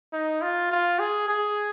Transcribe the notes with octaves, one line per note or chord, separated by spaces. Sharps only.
D#4
F4
F4
G#4
G#4